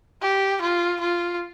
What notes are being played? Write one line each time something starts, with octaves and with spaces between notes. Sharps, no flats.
G4
F4
F4